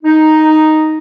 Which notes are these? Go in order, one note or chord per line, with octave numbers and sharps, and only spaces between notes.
D#4